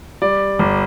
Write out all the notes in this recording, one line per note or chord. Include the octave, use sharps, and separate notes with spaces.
G3 D5
G1